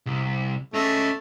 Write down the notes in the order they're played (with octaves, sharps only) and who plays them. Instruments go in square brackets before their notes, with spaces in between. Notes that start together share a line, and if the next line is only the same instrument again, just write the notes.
[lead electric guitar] C2
[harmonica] A3 [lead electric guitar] C#4 D#5